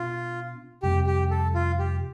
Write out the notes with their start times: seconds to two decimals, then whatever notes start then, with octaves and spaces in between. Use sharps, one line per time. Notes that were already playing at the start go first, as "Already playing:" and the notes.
Already playing: B2 B3 D4 F4
0.82 F2 C3 G3 C4 G4
1.07 G4
1.31 A4
1.55 F4
1.79 G4